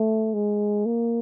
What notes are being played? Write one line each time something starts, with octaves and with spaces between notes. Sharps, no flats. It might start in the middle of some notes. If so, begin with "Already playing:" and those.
Already playing: A3
G#3
A#3